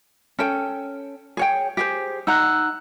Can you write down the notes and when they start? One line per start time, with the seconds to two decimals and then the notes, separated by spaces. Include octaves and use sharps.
0.39 C#4 A4 G5
1.37 G#4 C#5 G5
1.77 G4 G#4 C5
2.27 D#4 F#5 A#5 E6 F#6